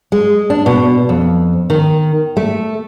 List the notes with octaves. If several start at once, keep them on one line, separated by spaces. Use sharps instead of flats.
G#3
D4
B2
F2
D#3
A3